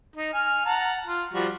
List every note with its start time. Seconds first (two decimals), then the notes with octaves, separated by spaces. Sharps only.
0.16 D#4
0.34 G#5 F6
0.65 F#5 A5 A#5
1.06 F4
1.33 F3 G3 F#4